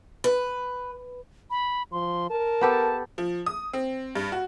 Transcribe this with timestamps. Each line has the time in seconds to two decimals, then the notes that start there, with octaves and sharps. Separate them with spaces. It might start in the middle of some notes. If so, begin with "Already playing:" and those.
0.24 B4
1.50 B5
1.92 F3 C6
2.30 A#4 A5
2.61 B3 G4 A4
3.18 F3
3.46 D#6
3.73 C4
4.15 G2
4.32 F#4